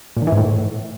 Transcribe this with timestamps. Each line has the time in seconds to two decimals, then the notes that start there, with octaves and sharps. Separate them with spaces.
0.17 A#2
0.22 D#3
0.27 E3
0.32 G#2
0.38 A2